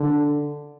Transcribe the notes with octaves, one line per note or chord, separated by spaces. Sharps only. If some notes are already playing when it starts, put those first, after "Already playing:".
Already playing: D3